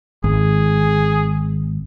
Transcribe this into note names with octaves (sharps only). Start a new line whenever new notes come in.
G#1 G#4